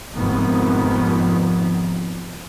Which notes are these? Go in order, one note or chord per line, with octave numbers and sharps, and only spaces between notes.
F1 F2 G#2 D#3 B3